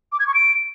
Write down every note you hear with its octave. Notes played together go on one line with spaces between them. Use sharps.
D6
G#6
C#6
D7